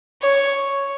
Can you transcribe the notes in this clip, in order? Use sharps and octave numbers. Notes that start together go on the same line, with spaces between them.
C#5